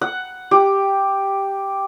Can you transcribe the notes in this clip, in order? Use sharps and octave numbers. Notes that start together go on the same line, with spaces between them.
F#5
G4